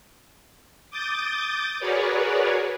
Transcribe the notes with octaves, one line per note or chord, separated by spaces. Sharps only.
D6 D#6 G6 A6
F#4 G#4 A#4 B4 C#5 D5